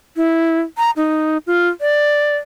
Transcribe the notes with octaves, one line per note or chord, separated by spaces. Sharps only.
E4
A#5
D#4
F4
D5